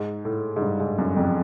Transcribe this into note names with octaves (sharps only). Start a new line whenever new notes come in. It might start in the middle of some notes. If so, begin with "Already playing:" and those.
Already playing: G#2
A2
G#2
G2
G#2
F#2
F2